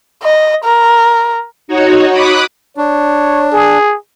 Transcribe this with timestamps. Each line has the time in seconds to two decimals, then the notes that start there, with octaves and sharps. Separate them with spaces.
0.23 D#5
0.64 A#4
1.68 D#4 F#4 C#5
2.11 B5 D6 D#6 F#6
2.77 D4 C#5
3.52 G#4